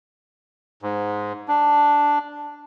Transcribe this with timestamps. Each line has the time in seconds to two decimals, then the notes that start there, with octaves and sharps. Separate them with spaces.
0.82 G#2
1.48 D4